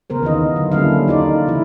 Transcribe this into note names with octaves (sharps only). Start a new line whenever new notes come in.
C#3 B3 A#4 C5
D#3 E3 F4 D#5
D3 F#3
G3 A#3 C#4 E4 A4 F5
D#4 F4 D5
C#3 E3 E4